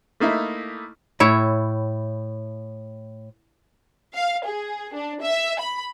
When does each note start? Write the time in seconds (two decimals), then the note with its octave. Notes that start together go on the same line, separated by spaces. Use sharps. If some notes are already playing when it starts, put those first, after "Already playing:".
0.20 A3 A#3 D#4 E4
1.20 A2 E4 C#5
4.14 F5
4.46 G#4
4.94 D4
5.23 E5
5.60 B5